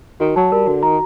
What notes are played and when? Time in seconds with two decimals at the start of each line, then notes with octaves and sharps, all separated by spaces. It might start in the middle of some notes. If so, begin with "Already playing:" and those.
0.20 D#3 F#4
0.36 F#3 A5
0.52 G3 A#4
0.67 D3 F#4
0.83 D#3 A#5